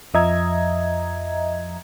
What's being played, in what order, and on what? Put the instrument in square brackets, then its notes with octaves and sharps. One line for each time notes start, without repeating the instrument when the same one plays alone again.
[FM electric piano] F2 F3 D#5 E5 A#5 G#6